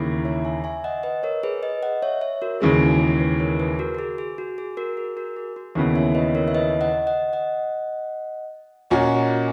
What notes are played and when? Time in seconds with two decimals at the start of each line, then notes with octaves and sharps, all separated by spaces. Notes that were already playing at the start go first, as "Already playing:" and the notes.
Already playing: D#2 C#3 E3 A#3 E4
0.25 C#5 E5
0.45 E5 G#5
0.64 E5 G#5
0.84 D#5 F#5
1.03 B4 D#5
1.23 A#4 C#5
1.43 G#4 B4
1.63 B4 D#5
1.83 D#5 F#5
2.02 C#5 E5
2.21 C#5 E5
2.42 F#4 A#4
2.61 D#2 C#3 E3 G#3 G#4 B4
2.74 G#4
2.80 F#4 A#4
3.01 G#4
3.20 G#4 B4
3.40 A#4 C#5
3.59 G#4 B4
3.79 F#4 A#4
3.94 F#4
3.99 G#4
4.18 G#4
4.38 F#4
4.58 G#4
4.77 F#4 A#4
4.97 G#4
5.17 F#4 A#4
5.37 G#4
5.56 F#4
5.75 D#2 C#3 E3 B3 A#4 C#5
5.95 C#5 E5
6.15 B4 D#5
6.35 A#4 C#5
6.48 E5
6.55 B4 D#5
6.81 D#5 F#5
7.07 D#5 F#5
7.33 D#5 F#5
8.90 A#2 A#3 C#4 F#4 D#5 F#5